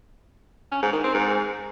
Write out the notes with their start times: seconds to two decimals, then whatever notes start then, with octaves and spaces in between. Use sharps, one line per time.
0.72 C#4
0.82 G#2
0.93 D#3
1.04 C4
1.14 G#2